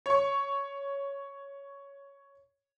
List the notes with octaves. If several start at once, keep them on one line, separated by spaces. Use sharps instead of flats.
C#5 C#6